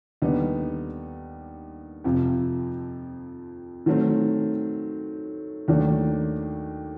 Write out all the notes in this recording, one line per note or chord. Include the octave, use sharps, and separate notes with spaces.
D#2 D3 G3 B3 D#4
F2 C3 F3
D#3 F#3 A3 C4
D#2 D#3 F#3 A3 D4